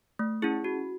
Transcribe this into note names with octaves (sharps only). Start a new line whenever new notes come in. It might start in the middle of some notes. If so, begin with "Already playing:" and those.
A3
C#4 E4 G#4
F#4